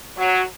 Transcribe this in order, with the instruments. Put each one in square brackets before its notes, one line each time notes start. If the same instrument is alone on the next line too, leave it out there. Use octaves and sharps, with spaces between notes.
[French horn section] F#3